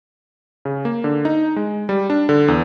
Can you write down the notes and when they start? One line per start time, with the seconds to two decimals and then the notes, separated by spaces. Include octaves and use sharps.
0.65 C#3
0.85 A#3
1.04 D3
1.25 D#4
1.56 G#3
1.89 G3
2.10 D4
2.29 D3
2.48 E2